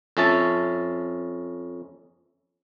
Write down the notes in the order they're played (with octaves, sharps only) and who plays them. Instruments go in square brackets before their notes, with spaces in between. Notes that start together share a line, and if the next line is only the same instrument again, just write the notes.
[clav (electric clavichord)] F2 C#4 E5 A5